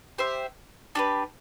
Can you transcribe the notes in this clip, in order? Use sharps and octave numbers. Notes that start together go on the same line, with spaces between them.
G4 C5 E5
D4 G4 B4